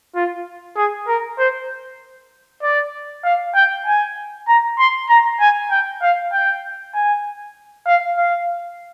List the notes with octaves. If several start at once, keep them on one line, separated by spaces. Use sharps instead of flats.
F4
G#4
A#4
C5
D5
F5
G5
G#5
A#5
C6
A#5
G#5
G5
F5
G5
G#5
F5
F5